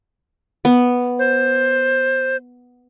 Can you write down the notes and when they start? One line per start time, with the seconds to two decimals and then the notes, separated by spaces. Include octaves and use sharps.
0.65 B3
1.19 C5